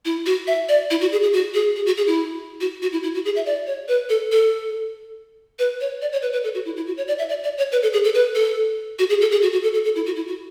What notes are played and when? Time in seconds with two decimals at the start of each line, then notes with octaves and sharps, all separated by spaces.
0.05 E4
0.26 F#4
0.47 E5
0.69 D5
0.91 E4
1.01 F#4
1.12 G#4
1.22 G#4
1.33 F#4
1.54 G#4
1.76 G#4
1.86 F#4
1.97 G#4
2.07 E4
2.61 F#4
2.82 F#4
2.92 E4
3.03 E4
3.15 F#4
3.25 G#4
3.36 E5
3.46 D5
3.67 C#5
3.88 B4
4.09 A4
4.32 A4
5.59 B4
5.81 C#5
6.02 D5
6.12 C#5
6.22 B4
6.33 B4
6.44 A4
6.55 F#4
6.65 E4
6.77 E4
6.87 F#4
6.97 C#5
7.08 D5
7.19 E5
7.29 D5
7.43 D5
7.58 C#5
7.72 B4
7.83 A4
7.93 G#4
8.04 A4
8.14 B4
8.35 A4
8.99 F#4
9.10 G#4
9.21 A4
9.32 G#4
9.42 F#4
9.52 F#4
9.63 A4
9.74 A4
9.84 A4
9.96 E4
10.06 F#4
10.16 E4
10.28 F#4